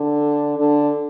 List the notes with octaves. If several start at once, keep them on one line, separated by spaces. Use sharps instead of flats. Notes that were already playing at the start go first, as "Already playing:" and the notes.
Already playing: D3
D3